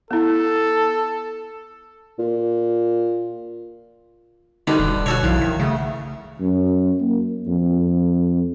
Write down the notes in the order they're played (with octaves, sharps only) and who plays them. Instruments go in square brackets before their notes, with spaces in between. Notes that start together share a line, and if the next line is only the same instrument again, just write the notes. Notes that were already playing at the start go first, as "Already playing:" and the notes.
[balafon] B3 E4 [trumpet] A4
[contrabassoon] A#2
[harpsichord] D3 B3 [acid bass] D#3 [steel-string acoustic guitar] D#4 F#4 G4
[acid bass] E1 [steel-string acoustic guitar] G2
[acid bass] B2 [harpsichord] F#4 A4 C#5
[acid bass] B1 [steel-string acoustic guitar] F3 E4 F5
[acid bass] D#3
[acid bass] C#3 [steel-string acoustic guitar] A3 F#5
[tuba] F#2
A#3
F2